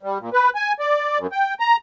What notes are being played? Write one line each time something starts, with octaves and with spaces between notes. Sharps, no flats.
G3
A#2
B4
G#5
D5
F#2
G5
A#5